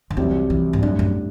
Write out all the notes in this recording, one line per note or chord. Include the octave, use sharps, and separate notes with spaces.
D3
C2 C3 E3 F#3 C4 G4
E3
G2
F#2 A2 G3 D4
F#2